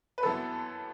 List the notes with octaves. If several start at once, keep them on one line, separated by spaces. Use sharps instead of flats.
B4
F#2 E3 B3 A4